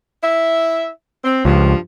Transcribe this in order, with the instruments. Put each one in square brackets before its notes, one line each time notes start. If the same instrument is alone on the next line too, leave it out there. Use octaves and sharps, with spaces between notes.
[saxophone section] E4 E5
C4
[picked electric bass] C#2 [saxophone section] G2 F3